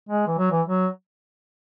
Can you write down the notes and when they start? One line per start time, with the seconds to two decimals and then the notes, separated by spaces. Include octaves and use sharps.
0.09 G#3
0.27 E3
0.38 F#3
0.52 E3
0.67 F#3